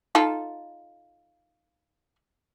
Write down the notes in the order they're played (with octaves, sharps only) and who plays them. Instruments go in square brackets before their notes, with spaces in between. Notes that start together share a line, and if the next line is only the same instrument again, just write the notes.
[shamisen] D#4 F4 A4